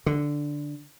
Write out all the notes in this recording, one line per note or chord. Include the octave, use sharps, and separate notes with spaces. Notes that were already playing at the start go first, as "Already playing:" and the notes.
D3